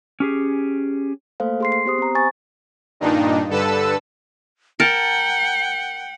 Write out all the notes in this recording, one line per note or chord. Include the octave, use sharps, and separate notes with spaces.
C#4 G4 G#4
A3 A#3 A4 C5 F5
G#4 C6 C7
C7
B3 G4 C5 D#6
C4 A#5
C5 G#5 C#6 A6
G2 A#2 D#3 D4 D#4
G2 D3 A4 B4 A5 E6
A#4 F#5 G5 A5